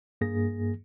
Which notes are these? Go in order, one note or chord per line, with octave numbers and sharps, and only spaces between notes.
G2 A#3 G#4 A#6